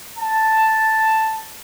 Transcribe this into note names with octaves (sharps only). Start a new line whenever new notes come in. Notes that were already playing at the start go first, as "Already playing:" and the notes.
A5